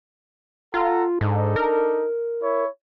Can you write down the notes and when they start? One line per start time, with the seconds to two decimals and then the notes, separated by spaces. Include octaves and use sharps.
0.74 F4 A4 F#5 A#5
1.21 G#2 D4 D#4 A4
1.56 A#4
2.43 E4 C#5